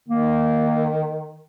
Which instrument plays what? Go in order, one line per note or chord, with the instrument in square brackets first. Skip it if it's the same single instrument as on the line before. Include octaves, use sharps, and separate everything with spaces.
[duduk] D#3 [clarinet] A#3